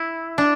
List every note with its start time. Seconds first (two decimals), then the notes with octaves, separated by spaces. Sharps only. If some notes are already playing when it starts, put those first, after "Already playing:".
Already playing: E4
0.38 D4